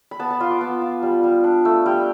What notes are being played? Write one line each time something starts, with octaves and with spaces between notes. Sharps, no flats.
B5
B3 A5
A5
F4 C6
D6
B3
F4
G3
G3
D4
A3
G3 G5